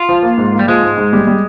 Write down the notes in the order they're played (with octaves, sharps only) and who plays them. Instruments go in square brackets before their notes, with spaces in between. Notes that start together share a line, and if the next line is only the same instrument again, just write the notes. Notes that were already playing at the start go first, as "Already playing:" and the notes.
Already playing: [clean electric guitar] F4
[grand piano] F3
A#3
G#2
A#3
[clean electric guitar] G3
[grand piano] F3 [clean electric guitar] G#3
[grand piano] G#2
G#2
G3
G3